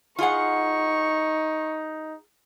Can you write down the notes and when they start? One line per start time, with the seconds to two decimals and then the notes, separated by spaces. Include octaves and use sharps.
0.19 D#4 F4 G#4 F#5 C#6